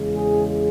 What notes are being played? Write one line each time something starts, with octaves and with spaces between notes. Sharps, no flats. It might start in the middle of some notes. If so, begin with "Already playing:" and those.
Already playing: E2 C#3 G#3
G#4